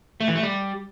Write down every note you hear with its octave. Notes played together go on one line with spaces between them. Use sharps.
A3
E3
A3
G3